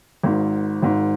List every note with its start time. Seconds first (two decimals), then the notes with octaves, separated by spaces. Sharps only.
0.23 G#1 G#2 D#3
0.82 G#1 G#2 D#3